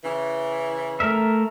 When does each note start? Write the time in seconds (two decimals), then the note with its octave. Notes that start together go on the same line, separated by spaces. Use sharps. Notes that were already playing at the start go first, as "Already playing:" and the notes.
0.04 C#3 E3
1.00 A3 A#4 E5